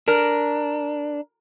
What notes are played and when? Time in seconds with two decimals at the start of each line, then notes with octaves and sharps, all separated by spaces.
0.08 D4 A#4